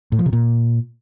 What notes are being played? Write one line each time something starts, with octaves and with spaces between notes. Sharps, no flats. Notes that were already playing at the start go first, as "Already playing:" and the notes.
A2
F3
C3
A#2